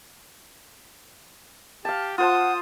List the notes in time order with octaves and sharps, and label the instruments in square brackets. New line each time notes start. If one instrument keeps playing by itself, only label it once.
[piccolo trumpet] G4 [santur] F5 A5
[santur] F4 C5 A5 [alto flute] F#5 [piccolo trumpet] D#6